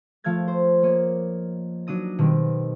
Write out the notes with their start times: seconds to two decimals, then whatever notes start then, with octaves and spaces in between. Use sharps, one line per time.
0.24 F3 A3 F5 F6 G#6 A6
0.48 C5
0.83 A#3 C#5 D#5
1.87 F#3 D4 D#4 D#6 A#6
2.19 B2 D#3 G3 C4 B4